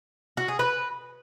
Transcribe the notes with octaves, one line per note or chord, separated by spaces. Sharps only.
F#4
G#4
B4